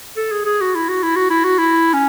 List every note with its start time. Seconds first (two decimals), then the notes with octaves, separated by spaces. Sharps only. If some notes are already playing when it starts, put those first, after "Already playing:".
0.17 A4
0.31 G#4
0.45 G#4
0.61 F#4
0.75 E4
0.89 F#4
1.03 E4
1.16 F#4
1.30 E4
1.44 F#4
1.58 E4
1.93 C#4